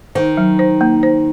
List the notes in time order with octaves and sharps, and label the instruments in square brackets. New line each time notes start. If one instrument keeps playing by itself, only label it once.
[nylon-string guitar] D#3 [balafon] C5
[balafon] F#3
C5
A#3
C5